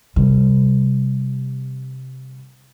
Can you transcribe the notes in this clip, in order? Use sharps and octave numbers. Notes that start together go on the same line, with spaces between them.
C3 G3